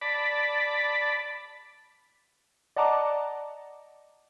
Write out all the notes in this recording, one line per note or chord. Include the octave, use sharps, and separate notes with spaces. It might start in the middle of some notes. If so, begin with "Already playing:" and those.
D5 A5 B5
D5 D#5 F#5 A5 A#5 D6